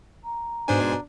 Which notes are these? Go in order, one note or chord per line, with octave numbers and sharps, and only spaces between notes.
A#5
G#2 B2 D4 C5 G#5